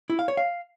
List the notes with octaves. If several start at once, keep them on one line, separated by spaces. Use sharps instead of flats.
E4
F5
C#5
F5